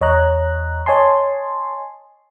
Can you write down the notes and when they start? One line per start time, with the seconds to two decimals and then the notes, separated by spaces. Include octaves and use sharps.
0.01 E2 C#5 D#5 A#5 F#6
0.86 C#5 D#5 G#5 A5 C6